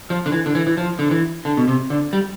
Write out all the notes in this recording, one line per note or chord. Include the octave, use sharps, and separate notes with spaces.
F3
D3
E3
D3
E3
E3
F3
D3
E3
D3
B2
C3
D3
G3